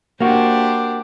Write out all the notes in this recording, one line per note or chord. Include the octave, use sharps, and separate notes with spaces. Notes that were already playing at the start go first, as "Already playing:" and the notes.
A#3 D4 F#4 G4 C5